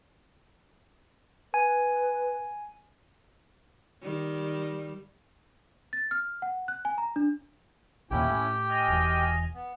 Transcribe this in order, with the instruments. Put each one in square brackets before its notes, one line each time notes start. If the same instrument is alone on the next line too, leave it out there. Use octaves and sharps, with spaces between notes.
[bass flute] B4 [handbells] G#5
[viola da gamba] D#3 G3
[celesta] A6
F6
F#5
F#6
G#5
A#5
D4
[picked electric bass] A#1 D#2 A#2 [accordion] C#4 E4 [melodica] G4 G5
[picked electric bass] A2
[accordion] D#5 G#5 F6
[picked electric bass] E1 E2
[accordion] B3